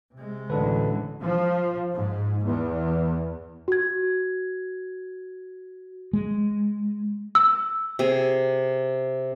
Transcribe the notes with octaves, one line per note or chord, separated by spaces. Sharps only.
C3 G#3
A1 D2 D3 D4 A4 B4
F3
G#2
E2
F#4 G#6
G#3
E6
C3 G#4